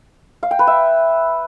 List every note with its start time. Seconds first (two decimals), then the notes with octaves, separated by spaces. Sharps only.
0.43 F5
0.51 G5
0.59 B4
0.67 E5